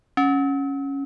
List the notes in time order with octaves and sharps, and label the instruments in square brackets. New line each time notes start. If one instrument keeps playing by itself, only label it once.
[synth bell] C#4